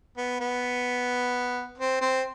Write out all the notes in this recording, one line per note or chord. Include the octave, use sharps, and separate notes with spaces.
B3
B3
C4
C4